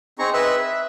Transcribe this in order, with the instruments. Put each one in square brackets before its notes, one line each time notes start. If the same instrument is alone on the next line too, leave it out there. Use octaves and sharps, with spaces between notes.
[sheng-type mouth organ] C4 D#4 G#4 A#5 C#6
B4 D#5 E5 E6 F#6
E5